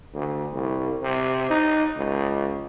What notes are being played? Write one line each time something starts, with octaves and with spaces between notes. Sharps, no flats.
D2
C2
C3
D#4
C#2